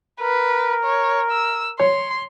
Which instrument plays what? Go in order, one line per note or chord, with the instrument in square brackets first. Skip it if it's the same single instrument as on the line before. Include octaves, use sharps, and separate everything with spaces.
[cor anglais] A#4 [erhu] B4
[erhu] C#5
E6
[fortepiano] C#5 [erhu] C6